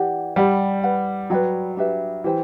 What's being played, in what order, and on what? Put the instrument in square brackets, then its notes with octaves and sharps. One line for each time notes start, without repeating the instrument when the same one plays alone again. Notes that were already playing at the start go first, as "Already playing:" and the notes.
Already playing: [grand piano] E3 [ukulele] G4 D5 F#5
[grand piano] G3 [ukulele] G4 D5 F#5 B5
[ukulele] B4 F#5 B5
[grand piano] F#3 [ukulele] B4 D5 G5 B5
[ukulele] D4 G4 B4 E5
[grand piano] E3 [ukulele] G4 C5 G5